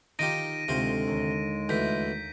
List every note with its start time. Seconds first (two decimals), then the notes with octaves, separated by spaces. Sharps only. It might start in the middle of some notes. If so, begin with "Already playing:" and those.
0.19 D#3 D#4 F4 G4 A#6 D7 D#7
0.68 D2 C3 G#3 F4 C5
1.07 D#2
1.69 D2 E3 G6 B6